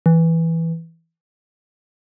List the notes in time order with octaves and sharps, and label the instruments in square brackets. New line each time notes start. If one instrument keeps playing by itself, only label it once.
[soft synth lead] E3